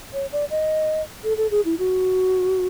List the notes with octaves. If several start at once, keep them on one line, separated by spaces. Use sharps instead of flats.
C#5
D5
D#5
A4
A4
G#4
E4
F#4